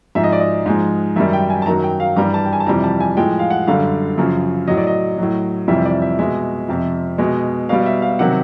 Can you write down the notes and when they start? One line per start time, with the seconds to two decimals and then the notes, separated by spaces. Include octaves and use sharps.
0.15 G#2 F3 G#3 E5
0.24 D#5
0.32 D5
0.40 D#5
0.66 G#2 F3 G#3
1.16 F#2 D#3 G3 E5
1.33 G5
1.50 G#5
1.62 A5
1.66 F#2 D#3 F#3 A#5
1.84 G5
2.00 F5
2.16 G2 E3 G3 A#5
2.34 A5
2.45 G5
2.53 G#5
2.60 A5
2.66 F2 C3 E3 G3 A#5
2.84 A5
3.00 G#5
3.17 A2 F3 G#3 G5
3.39 F5
3.50 F#5
3.67 F#2 D3 G3 F5
4.18 F#2 C#3 F3
4.68 A2 F#3 D#5
4.77 D5
4.87 D#5
5.18 A2 F#3
5.68 F2 C3 E3 G3 E5
5.85 D5
6.02 E5
6.19 B2 G#3 E5
6.68 F2 C3 F3
7.18 B2 G#3
7.69 B2 G3 F5
7.86 E5
8.02 F5
8.19 C3 D#3 F#3 F#5